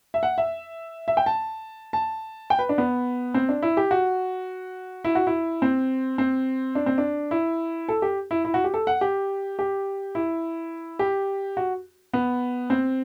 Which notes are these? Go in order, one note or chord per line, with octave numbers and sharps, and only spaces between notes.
E5
F#5
E5
E5
G5
A5
A5
G5
B4
D4
B3
C4
D4
E4
G4
F#4
E4
F#4
E4
C4
C4
D4
C4
D4
E4
A4
G4
E4
E4
F#4
G4
A4
F#5
G4
G4
E4
G4
F#4
B3
C4